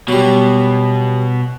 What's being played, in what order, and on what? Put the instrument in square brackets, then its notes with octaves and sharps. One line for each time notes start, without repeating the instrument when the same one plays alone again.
[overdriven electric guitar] B2 [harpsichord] F#3 G3